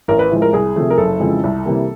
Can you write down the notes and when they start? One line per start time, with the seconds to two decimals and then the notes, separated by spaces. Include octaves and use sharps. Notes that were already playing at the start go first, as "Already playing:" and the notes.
0.08 A1 A#4
0.19 B4
0.31 A2 F3 G#3
0.42 A#4
0.53 C2 G#4
0.76 C3 F3 A3
0.90 A#4
0.98 F#1 A4
1.20 F2 C#3 E3 G#3
1.44 C2
1.66 C3 E3 G3 A#3